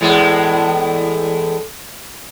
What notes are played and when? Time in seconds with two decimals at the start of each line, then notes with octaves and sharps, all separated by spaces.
0.01 E2 A2 G#3